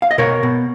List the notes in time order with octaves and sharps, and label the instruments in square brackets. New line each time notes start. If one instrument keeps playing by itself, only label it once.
[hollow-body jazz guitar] F5
D#5
B2 A#4 C#5
B2